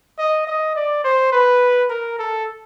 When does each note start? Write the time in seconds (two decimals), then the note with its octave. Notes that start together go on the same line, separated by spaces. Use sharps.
0.19 D#5
0.47 D#5
0.76 D5
1.04 C5
1.33 B4
1.90 A#4
2.19 A4